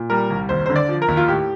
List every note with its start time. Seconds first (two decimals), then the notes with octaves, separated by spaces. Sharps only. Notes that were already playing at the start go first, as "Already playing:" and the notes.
Already playing: A#2
0.10 G3 A#4
0.30 C2
0.49 D#2 C5
0.66 D3 C5
0.76 D5
0.89 F3
1.02 A#4
1.08 D#2
1.17 F4
1.28 A2 G4